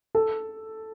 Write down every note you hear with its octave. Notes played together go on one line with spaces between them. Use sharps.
A4